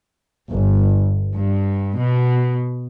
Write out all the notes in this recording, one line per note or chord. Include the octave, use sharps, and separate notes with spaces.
G1
G2
B2